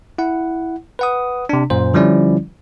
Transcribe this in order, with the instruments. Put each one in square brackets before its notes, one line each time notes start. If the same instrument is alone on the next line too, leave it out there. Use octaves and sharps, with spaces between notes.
[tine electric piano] E4 F#5
B4 F#5 D#6
C3 D4
F#2 A#2 C5
D3 F3 G3 C#4 E4 D5